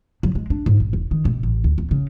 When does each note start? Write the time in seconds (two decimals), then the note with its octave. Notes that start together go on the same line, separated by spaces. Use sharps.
0.23 F#3
0.35 G#3
0.50 D4
0.66 G#2
0.80 A1
0.93 E1
1.11 D#3
1.25 B2
1.43 A1
1.64 D2
1.78 E2
1.91 C#3